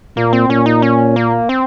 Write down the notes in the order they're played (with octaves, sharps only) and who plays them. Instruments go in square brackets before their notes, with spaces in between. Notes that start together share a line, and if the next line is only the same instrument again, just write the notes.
[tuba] A#2 [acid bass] A#3
[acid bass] C4
[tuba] A#2 [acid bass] C#4
[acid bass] D#4
C#4
A#3
C4